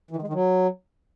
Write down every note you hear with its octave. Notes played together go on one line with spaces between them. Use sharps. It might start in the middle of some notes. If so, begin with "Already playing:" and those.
E3
D#3
G#3
D#3
F#3